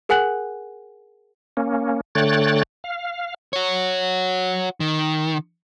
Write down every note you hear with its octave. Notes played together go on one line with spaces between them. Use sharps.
G#4 A#4 F#5 G#5 F#6 F#7
A#3 C#4
D3 A3 C#5 G5 F#6 A6
F5
F#4 C#5
D#3